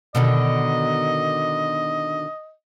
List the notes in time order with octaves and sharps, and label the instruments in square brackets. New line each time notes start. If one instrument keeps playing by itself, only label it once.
[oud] B2 D3 D#3 [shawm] D#5